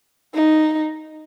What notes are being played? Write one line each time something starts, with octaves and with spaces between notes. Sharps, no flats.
D#4